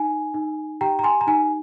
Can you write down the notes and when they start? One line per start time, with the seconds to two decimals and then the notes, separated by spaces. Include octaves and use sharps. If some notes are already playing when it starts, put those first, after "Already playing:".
Already playing: D#4 G#5
0.34 D#4
0.81 G4 G5 A#5
0.99 A#5
1.03 G#5 C6
1.21 A#5
1.27 D#4 G#5